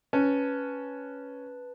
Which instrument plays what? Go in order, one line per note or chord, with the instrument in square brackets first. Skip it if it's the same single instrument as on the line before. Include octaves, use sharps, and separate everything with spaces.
[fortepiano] C#4 [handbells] B4 A5